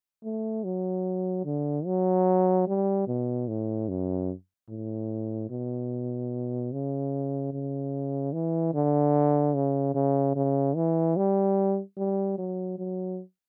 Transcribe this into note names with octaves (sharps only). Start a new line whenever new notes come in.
A3
F#3
D3
F#3
G3
B2
A2
F#2
A2
B2
C#3
C#3
E3
D3
C#3
C#3
C#3
E3
G3
G3
F#3
F#3